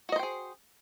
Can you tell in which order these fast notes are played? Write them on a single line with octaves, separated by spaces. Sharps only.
F#4 D#5 C5 G5 G#4